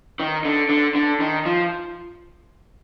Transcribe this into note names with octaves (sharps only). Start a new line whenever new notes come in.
D#3
D3
D3
D3
D#3
F3